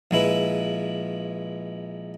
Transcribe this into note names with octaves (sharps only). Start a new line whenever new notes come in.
A#1 G#3 E4 B4